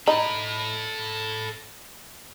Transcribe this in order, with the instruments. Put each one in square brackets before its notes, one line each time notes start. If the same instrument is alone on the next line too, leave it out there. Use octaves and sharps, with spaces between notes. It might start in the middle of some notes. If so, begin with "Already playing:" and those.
[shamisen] D#4 [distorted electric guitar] A4 B5